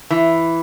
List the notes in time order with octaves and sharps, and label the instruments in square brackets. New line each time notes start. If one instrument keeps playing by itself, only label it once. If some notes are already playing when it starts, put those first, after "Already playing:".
[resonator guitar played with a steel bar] E3